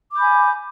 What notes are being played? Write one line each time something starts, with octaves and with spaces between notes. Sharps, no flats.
G#5 B5 D6 G6